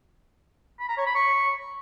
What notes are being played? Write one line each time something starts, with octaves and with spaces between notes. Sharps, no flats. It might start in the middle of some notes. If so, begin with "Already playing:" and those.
B5
A#5
C#5
B5
C#6